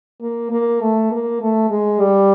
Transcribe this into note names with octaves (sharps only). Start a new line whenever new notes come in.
A#3
A#3
A3
A#3
A3
G#3
G3